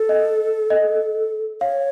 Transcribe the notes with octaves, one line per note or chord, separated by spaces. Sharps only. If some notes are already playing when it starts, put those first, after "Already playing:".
Already playing: A4
D#5
D#5
C#5 F5